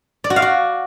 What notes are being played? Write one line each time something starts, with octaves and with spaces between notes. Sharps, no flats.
D5
F#4
F5
F#4